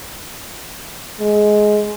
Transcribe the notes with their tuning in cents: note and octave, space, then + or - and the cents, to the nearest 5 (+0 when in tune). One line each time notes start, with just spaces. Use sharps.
G#3 +15